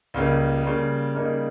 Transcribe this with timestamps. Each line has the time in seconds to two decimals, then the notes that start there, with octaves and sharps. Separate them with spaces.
0.14 C#2 C#3 G3 A#3
0.64 C#3 G3 A#3
1.15 C#3 G3 A#3 D#4